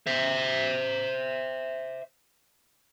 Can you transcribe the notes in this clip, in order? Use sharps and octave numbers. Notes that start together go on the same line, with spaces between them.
C5 E5